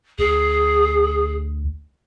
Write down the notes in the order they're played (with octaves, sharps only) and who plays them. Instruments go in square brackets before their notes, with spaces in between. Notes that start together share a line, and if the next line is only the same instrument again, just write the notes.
[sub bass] D2 [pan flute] G#4